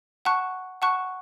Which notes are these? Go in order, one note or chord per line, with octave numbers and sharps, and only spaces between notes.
F#5 A5 C#6 F#6
F#5 A5 C#6 F#6